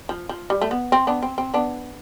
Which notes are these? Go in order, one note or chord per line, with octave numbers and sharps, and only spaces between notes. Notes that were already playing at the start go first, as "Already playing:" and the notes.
F3
F3
G3
A3
B3
C4
B3 D4
C4
C4
B3 D4